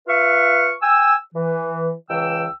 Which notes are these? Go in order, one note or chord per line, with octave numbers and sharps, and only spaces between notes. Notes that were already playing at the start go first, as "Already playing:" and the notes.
F4 B4 E5 F5 C#6
G5 G#5 E6
E3
C#2 E3 G5 E6